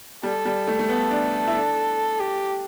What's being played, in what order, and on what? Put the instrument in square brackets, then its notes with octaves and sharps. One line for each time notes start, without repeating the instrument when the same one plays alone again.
[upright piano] G3 [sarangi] A4
[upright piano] G3
A3
A3
[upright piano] B3 [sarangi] A4
[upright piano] D4
E4
D4
[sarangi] G4